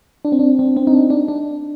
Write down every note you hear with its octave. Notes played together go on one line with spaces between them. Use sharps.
D4
C4
D4
C4
C4
D#4
D4
D4
D4